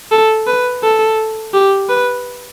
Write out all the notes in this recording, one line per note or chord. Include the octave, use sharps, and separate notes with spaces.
A4
B4
A4
G4
B4